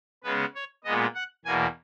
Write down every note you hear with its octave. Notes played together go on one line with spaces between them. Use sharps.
C#3 G#3 B3 B4
C#5
A#2 G#3 B3 D#5
F#5
E2 B2 A#3 G#5